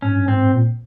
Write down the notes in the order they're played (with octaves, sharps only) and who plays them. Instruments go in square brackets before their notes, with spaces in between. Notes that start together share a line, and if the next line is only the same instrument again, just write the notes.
[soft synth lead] G#2 [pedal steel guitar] C#4
[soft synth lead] G2
[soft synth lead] G#2 [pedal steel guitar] C4
[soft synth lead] G#2
A#2